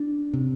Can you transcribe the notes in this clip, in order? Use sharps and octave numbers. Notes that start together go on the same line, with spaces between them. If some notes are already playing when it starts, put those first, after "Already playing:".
Already playing: D4
C3